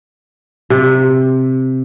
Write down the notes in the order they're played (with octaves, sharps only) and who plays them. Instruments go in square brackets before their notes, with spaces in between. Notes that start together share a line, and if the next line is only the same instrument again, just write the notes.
[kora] C3